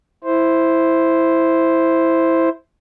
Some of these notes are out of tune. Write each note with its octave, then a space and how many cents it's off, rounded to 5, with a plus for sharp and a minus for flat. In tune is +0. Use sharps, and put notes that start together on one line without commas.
E4 +0 C5 +0